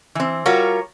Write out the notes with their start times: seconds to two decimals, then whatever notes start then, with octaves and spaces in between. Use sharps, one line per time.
0.15 E3 C4
0.46 G3 F4 F#4 A#4 C#5